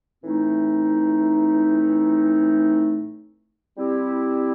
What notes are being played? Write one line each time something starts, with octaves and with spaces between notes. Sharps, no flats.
A2 E3 A3 C4 D#4
G3 C4 E4 G4